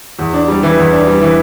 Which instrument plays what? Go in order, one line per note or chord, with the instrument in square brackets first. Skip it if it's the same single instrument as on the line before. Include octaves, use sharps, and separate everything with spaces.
[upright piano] E2
D4
G3
E3
E2
D4
G3
E3